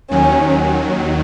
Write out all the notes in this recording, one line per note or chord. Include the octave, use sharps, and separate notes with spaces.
D#2 D#3 F#3 C#4